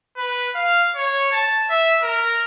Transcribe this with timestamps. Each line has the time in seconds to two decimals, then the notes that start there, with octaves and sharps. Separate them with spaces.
0.17 B4
0.55 F5
0.95 C#5
1.32 A5
1.70 E5
2.02 A#4